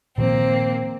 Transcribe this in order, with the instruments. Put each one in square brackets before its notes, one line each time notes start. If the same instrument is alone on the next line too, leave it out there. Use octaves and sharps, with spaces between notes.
[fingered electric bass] A#2 D#3 F3 [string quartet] A#3 C4